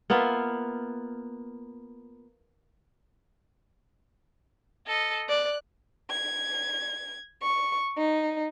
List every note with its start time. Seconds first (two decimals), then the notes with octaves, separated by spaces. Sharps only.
0.10 A#3 B3 F4 E5
4.87 A4 D#5
5.29 D5 F#6
6.10 G#6
7.42 C#6
7.98 D#4